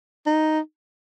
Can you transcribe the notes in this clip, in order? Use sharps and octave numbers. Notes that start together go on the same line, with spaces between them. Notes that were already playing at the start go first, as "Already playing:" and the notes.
D#4